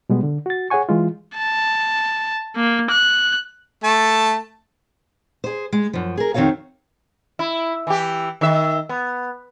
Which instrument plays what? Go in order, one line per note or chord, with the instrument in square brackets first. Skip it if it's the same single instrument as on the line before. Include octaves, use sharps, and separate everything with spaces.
[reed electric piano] B2 G3 G#3 B3
D3
F#4 A6
G#4 C#5 F#5 G#5 C#6
E3 G#3 F4
[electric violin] A5
A#3
F#6
[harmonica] A3 A5
[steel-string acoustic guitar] G#4 C5
G#3
F#2 F3
G#4 A#4
F2 D#3 C4 F#4 C#5 F5
[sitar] E4
E3 G4
D#3 E5
B3